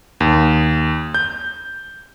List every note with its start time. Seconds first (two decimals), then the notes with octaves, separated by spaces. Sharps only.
0.20 D#2
1.14 G6